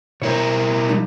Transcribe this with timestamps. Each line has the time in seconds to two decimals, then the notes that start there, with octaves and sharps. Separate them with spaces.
0.22 B2 E4 A#4 C5 C#5
0.89 F3 G3 D#4